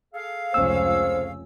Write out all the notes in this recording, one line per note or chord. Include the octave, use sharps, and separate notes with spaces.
G#4 A4 F5
F1 C#2 C#4 C5 E6